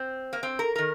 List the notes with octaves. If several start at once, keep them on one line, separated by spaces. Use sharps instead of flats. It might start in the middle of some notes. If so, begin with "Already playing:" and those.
Already playing: C4
A#3
C4
A#4
D#3 A#4